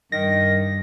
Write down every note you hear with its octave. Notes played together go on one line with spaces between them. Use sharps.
G2 D#3 A#6